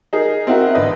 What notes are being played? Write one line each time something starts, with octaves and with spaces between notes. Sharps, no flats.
D#4 G#4 A#4
C4 D#4 E4 F#4 A#4
A1 D3 B4 D#5